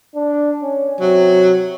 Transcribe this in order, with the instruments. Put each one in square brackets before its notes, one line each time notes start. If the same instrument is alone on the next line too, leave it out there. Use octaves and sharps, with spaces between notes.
[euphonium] D4
C#4
[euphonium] C3 [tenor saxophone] F#3